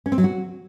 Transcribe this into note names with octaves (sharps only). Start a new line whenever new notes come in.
C#4
C4
F#3
F#4